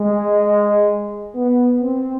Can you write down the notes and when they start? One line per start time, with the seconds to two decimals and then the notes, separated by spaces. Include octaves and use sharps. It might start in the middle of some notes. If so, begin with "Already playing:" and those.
Already playing: G#3
1.35 B3
1.82 C4